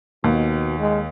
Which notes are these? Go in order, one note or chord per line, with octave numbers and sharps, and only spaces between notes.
D#2 B2
G#3